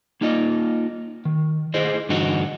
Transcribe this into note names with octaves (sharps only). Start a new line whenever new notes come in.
A#3 D#4 F4 D#5
D#3
E4 G#4 C5 D#5
G2 D3 E3 D#4 F#4